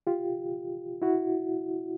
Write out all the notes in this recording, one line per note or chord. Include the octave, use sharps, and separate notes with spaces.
F4 G4
E4 F#4